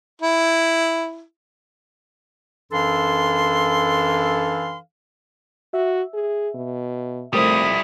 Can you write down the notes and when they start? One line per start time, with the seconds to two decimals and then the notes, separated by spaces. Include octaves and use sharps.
0.22 E4
2.72 F#2 E3 D4 A4 F5 C6
5.74 F#4 E5
6.14 G#4
6.55 B2
7.33 F2 G3 A3 E4 A#4 C5 D#6